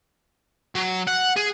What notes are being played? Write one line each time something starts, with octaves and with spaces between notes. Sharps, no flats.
F#3
F#5
G#4